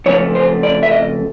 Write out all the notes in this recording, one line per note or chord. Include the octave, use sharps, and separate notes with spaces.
F2 C#3 F3 A3 C#5
C5
D5
E5
D#5